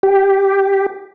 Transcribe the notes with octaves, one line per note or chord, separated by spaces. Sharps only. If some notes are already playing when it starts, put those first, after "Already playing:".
G4